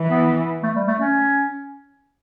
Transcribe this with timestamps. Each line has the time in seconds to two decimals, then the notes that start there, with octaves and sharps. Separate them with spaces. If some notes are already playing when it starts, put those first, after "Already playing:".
Already playing: E3
0.10 B3
0.63 A3
0.76 G3
0.88 A3
0.99 C#4